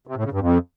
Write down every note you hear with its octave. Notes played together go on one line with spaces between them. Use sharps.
C3
A2
C#3
G2
F2